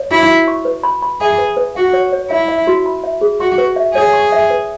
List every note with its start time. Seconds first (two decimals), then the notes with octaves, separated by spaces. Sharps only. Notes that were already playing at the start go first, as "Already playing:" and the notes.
Already playing: C#5
0.11 E4 F#4
0.29 F#4
0.48 C#6
0.65 B4
0.83 B5
1.02 B5
1.21 G#4 E5
1.38 B4
1.57 B4
1.75 F#4 F#5
1.93 C#5
2.12 C#5
2.30 E4 E5
2.48 E5
2.67 F#4
2.86 B5
3.04 E5
3.21 G#4
3.40 F#4 C#6
3.58 B4
3.76 E5
3.95 G#4 C#5
4.13 C#6
4.32 E5
4.50 B4